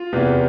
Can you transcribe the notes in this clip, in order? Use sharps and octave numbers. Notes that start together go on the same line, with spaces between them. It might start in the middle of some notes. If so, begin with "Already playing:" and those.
Already playing: F4
E2 C3 E3